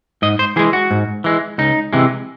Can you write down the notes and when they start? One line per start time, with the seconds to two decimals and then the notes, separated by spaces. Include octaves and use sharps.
0.22 G#2 D#5
0.39 C5
0.56 E3 G#3 G#4
0.73 F#4
0.91 G#2
1.24 E3 G#3
1.58 C#2 D#4
1.93 C3 E3 G#3